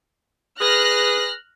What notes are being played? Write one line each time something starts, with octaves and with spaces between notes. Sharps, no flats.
G#4 B4 F6 F#6 A#6